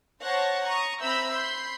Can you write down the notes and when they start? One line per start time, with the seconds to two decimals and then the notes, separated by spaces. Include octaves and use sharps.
0.22 C5 C#5 F#5 A5 C#6 A#6
0.65 A#5 C#6 D#6
1.01 C4 E5 A#5 B5 E6 G6
1.32 B5 C6 G6